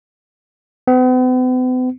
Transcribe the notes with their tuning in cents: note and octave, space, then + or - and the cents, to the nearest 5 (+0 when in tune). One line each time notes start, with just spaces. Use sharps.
B3 +45